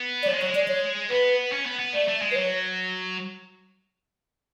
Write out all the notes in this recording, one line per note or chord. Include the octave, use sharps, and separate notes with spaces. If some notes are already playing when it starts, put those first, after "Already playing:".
Already playing: B3
D5
A3 C#5
G#3
F#3 C#5
G#3
D5
C#5
B3 B4
C#4
B3
B3
A3 D5
A3
G#3
B4
F#3 C#5